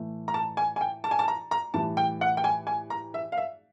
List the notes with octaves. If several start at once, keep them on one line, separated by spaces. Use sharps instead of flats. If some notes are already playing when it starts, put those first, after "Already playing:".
Already playing: A2 E3 A3
A#5
A5
G#5
G#5
G5
A5
G#5
A5
A#5
A#5
A2 E3 G3 A5
G5
F#5
G5
G#5
G#5
A#5
E5
F5
E5